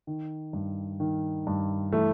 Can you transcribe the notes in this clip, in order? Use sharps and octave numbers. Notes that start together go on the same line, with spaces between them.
D#3
G2
D#3
G2
E3 A3